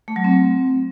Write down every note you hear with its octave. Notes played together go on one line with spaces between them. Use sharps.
A3
F#3
C4